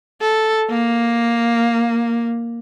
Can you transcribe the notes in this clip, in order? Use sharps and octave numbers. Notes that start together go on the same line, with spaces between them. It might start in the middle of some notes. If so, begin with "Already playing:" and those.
A4
A#3